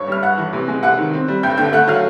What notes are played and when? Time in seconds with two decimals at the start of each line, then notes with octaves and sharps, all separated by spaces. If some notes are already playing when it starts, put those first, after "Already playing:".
Already playing: G2 C#5 C#6
0.08 G3 F6
0.23 G2 F#5 F#6
0.38 E3
0.53 C3
0.68 G#3
0.83 C3 F#5 F#6
0.98 D#3
1.14 C4
1.28 G3
1.43 G2 G5 G6
1.58 D3 G5 G6
1.73 A3 F#5 F#6
1.88 F#3 F5 F6